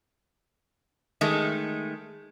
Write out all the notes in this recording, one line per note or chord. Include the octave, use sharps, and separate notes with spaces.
D#3 G#3 A3